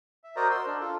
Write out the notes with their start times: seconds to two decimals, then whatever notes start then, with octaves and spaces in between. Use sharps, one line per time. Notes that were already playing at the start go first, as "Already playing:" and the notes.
0.24 E5
0.36 F#4 A#4 C5 D5 D#5 A#5
0.51 C6 E6
0.67 D4
0.81 F4 A4